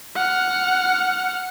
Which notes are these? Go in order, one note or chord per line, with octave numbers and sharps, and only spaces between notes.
F#5 F6